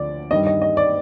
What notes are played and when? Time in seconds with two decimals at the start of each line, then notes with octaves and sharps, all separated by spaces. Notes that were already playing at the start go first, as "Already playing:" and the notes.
Already playing: D2 D3 F3 D5
0.31 G2 D#3 G3 D#5
0.46 D#5
0.62 D#5
0.77 D5